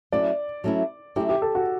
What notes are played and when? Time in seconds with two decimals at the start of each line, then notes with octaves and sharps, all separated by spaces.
0.12 F#3 A3 C#4 E4 D5
0.64 F#3 A3 C#4 E4
1.16 F#3 A3 C#4 E4 G4
1.29 G4
1.42 A4
1.55 F#4